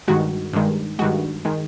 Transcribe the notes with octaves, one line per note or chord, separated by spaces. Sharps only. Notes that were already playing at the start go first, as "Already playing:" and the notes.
G2 D#3 G#3 F#4
G2 D#3 G#3
G2 D#3 G#3 F#4
D#3 G#3